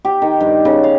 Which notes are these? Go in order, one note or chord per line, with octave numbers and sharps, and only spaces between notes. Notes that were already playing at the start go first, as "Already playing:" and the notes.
G4
D#3
G2
C#3
F5